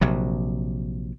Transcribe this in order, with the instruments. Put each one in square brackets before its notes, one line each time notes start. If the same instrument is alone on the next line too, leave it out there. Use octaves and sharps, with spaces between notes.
[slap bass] A#1 C3 F#3